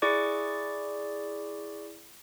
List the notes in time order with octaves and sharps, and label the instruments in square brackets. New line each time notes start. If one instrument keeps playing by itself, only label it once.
[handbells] E4 G#4 D5 C#6 D6